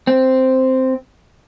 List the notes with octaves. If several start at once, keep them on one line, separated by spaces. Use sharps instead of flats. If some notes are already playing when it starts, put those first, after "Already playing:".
C4